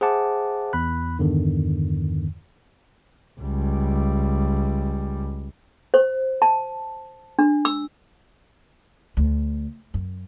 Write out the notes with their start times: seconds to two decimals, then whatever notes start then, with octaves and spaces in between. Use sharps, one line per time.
0.01 G#4 C5 E5 F#5 A5 D6
0.73 E2 B5 F#6
1.18 E2 G2 D3 D#3
3.41 C#2 G3
5.94 C5
6.42 A5
7.39 D4
7.65 E6
9.17 D2
9.94 F#2